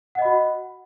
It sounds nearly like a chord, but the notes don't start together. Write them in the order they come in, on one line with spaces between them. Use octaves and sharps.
F#5 D#5 B5 F#4